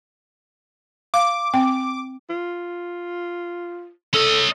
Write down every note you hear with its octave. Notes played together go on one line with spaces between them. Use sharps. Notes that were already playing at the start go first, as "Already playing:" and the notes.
F5 D6
C4 G5
F4
C#4 A4 D#5